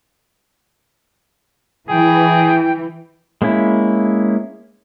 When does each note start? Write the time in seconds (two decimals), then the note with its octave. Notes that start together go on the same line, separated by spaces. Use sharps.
1.89 E3 G#4 G5
3.42 G#3 A#3 C#4 E4